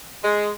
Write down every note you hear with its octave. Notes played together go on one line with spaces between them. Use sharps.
G#3